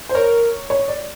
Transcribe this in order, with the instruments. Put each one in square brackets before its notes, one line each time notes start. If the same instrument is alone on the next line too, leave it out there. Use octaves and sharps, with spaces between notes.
[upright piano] C5
[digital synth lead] A#4 [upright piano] C#5
[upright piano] C#5
D5